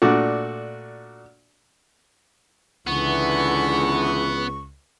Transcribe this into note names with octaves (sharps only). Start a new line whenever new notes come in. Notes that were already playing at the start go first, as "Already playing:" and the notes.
A#2 A3 D4 F#4
C#2 D3 E3 B3 C#6